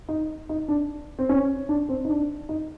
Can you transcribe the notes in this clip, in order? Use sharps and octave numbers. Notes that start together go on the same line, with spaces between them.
D#4
D#4
D4
C4
C#4
D4
C4
D#4
D4
D#4